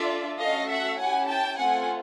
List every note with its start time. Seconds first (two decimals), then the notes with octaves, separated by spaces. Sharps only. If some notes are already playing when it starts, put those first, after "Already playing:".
Already playing: D4 F4 A4 D5 E5
0.38 A3 C#4 F#4 A4 D#5 F5
0.68 E5 F#5
0.97 C#4 E4 G4 F#5 G#5
1.27 G5 A5
1.57 A3 C4 F4 A4 F#5 G#5